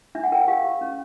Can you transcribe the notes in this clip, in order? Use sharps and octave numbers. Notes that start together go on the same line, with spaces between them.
D4 E5
F#5
A#4 G5
F#5
G4 F5
G4
C#4